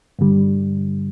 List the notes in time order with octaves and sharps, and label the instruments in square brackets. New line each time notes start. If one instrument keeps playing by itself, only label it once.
[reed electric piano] G2 D3 G3